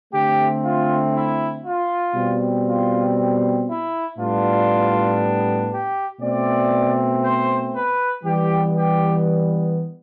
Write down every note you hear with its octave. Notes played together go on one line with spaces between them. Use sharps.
D3 A3 C4 G4
F4
E4
F4
B2 G3 C4
F4
E4
A2 G3 B3 D4 F4
G4
B2 A3 C4 D5
C5
B4
E3 G3 B3 G4
G4